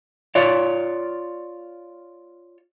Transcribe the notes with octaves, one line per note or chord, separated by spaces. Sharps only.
F4 C#5 D5